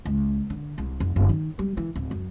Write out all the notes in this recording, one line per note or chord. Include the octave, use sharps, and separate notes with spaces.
C#2
D3
C2
F1
F#1
D#3
G3
E3
D1
F#2